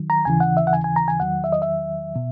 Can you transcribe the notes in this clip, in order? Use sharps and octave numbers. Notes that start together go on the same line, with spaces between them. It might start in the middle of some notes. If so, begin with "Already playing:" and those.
Already playing: D#3 F#3
A#5
D#2 C#3 E3 G#5
F#5
E5
F#5
G#5
G#5
A#5
G#5
E2 D#3 F#3 F#5
E5
D#5
E5
B2